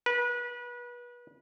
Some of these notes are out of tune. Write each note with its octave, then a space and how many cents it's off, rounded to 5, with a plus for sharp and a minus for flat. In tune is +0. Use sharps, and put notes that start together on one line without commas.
B4 -30